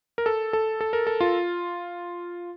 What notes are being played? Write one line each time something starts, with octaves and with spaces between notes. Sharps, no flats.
A#4
A4
A4
A4
A#4
A4
F4